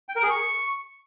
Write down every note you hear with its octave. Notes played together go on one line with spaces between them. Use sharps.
G5
A#4
G#4
C#6